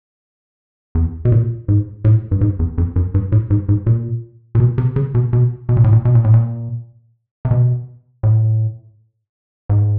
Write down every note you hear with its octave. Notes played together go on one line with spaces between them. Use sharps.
E2
B2
A#2
G#2
A2
G2
G#2
E2
F2
F#2
G2
A2
G#2
G#2
A#2
A#2
B2
C3
C#3
B2
B2
B2
A#2
A2
A#2
B2
A#2
A2
A#2
C3
B2
A2
G#2